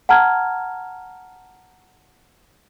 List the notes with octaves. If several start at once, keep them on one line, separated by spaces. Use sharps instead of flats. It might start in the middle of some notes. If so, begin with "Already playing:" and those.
F#5 A5 A#5 F6 G#6